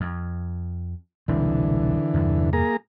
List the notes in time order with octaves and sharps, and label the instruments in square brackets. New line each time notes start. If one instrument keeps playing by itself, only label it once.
[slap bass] F2
[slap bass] E1 C2 C4 [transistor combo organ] D3 E3
[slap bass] E2 G2 C3
[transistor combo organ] A#3 G#4 A#5